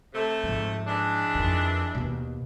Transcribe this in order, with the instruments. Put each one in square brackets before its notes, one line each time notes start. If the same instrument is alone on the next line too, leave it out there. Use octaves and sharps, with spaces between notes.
[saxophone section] C3 A3
[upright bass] G#2 F3
[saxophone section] E3 G#3 D4
[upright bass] F2 D#3
D#2 B2